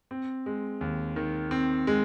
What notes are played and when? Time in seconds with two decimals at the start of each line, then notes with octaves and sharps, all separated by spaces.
0.11 C4
0.46 G#3
0.81 D#2
1.16 D#3
1.51 C4
1.87 G#3